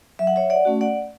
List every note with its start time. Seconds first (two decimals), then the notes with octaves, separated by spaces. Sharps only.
0.19 F#3 E5
0.27 F#5
0.36 C#5 E5
0.50 D5 F#5
0.65 A3 C#4 F#4
0.81 D5 F#5